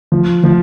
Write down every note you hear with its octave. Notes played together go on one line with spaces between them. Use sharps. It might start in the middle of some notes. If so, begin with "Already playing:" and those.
F3
F3